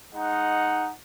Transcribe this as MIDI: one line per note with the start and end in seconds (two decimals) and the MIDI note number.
0.14 0.88 56
0.14 0.88 63
0.14 0.88 78